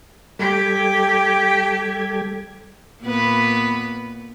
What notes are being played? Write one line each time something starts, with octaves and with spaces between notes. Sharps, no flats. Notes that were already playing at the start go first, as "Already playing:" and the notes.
G3 G4 A4 G#6
A#2 B3 B4